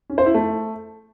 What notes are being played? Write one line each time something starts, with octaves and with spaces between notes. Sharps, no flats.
C#4
C5
E4
A3